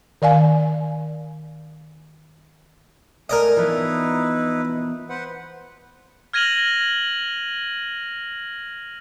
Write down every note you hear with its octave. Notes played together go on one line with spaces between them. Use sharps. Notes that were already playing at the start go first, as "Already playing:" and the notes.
D#3 D5 F5 G#5
A3 A#4 D5 D#5 G#5 D#6
E3 F3 B3 D#4 E4 B4
B4 C5 F#5
F6 G#6 A#6 D#7 F7 F#7